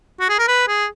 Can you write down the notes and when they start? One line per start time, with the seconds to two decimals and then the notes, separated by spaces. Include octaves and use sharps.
0.20 F#4
0.29 G#4
0.39 A#4
0.48 B4
0.68 G#4